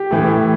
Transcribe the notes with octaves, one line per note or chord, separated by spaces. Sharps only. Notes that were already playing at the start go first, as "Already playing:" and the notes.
Already playing: G4
A2 E3 A3